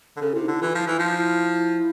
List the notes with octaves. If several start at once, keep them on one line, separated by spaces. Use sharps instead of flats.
D3
C#3 A4
C3 E4
D#4
D3 E4
E3 F4
F3 E4
E3 E4
F3 E4
E4